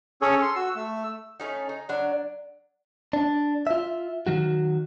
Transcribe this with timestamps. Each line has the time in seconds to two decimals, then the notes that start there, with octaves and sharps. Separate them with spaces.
0.22 C#4 G#4 A4 C#5
0.42 A4 C6
0.56 F#4 E6
0.76 A3 E6
1.40 A3 C#4 D#4
1.69 D#4
1.89 F#3 D4
3.13 D4
3.67 F4 E5
4.27 D#3 F#3 F#4